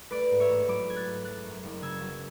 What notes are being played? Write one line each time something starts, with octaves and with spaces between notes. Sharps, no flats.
A3 B4 D5
G#2
C#5 E5
A1
F#3 B5 D6
A3 G#6
F#6 A6
G#2
F#3 F#6 A6
F#2
F#1
C#3 E6 G#6
F#3